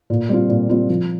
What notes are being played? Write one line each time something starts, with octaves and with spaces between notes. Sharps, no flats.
A#2
G3 C4 F4
A#2
G3 C4 F4
F3